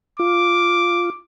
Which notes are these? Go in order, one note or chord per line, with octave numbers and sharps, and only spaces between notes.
F4 D6